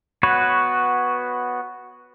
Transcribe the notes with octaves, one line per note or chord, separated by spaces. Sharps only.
B3 F#4 B4 C#5